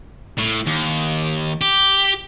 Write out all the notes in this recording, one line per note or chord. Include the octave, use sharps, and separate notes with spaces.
A2
D#2
G4